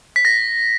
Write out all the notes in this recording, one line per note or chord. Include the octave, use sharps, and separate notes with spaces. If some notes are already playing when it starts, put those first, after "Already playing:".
B6
A#6